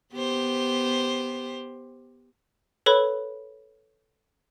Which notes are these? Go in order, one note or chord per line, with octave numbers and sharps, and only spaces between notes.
B3 G4 C5
A4 B4 C#5 B5